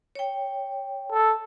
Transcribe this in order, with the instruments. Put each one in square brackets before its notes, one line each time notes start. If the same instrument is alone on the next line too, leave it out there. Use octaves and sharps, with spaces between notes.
[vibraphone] C#5 G5
[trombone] A4